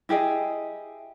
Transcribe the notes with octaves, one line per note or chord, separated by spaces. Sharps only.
E4 G4 G#4 D#5